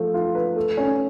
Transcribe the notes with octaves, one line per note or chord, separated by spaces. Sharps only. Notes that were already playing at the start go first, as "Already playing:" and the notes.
Already playing: F3 A3
F4
B4
A3
C#4